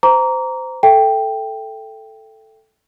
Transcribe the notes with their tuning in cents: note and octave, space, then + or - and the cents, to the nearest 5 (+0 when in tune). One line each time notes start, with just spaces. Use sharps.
C5 -20 A#5 +0 D6 -35
A4 +0 E5 +30 G5 +0